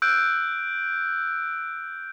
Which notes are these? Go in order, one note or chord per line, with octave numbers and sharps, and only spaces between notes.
E6 F#6 G6 D7